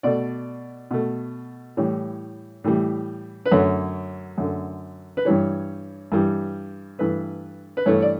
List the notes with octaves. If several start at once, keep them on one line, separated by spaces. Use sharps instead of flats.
B2 A3 D5
B2 A3
A2 E3 G3 C#5
A2 E3 G3
B4
F#2 D3 A3 C#5
F#2 D3 A3
B4
G2 E3 G3 C#5
G2 E3 G3
G2 E3 A3 B4
B4
G2 E3 A3 C#5
D5